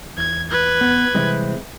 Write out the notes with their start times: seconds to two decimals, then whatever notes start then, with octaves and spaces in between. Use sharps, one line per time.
0.18 E2 G#6
0.50 B4 G#6
0.81 B3
1.15 C3 E3 G3 G#3 C4 E4